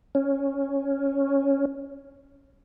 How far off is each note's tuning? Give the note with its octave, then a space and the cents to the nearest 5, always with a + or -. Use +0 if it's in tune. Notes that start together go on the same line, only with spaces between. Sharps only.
C#4 -5